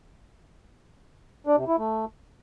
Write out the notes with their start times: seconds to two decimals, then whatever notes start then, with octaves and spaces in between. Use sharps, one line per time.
1.47 D4
1.57 C3
1.68 E4
1.78 A3